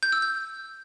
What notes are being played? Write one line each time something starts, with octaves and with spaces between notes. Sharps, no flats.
G6
E6
G6